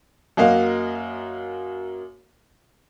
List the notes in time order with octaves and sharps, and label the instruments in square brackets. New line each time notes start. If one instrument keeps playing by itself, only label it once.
[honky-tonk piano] F#2 A#3 F#4 D#5 F5